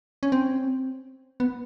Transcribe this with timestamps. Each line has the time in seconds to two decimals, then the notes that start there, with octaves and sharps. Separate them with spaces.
0.23 C#4
0.32 C4
1.40 B3